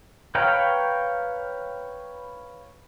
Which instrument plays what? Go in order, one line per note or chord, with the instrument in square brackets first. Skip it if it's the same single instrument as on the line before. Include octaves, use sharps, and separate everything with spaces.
[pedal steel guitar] B4 C#5 F5 G5 A#5